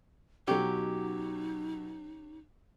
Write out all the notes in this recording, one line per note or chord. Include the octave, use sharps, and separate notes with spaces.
B2 F#3 C#4 D#4 G4